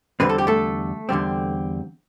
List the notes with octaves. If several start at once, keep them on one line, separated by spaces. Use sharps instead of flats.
E2 D3 G3 C4 B4
A4
G4
A3 A4
E2 D3 G3 C4